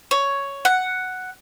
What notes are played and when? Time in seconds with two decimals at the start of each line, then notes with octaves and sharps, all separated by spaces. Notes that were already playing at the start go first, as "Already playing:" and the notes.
0.11 C#5
0.65 F#5